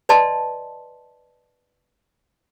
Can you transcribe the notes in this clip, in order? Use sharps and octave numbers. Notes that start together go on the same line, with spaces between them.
B4 D5 D#5 A5 C6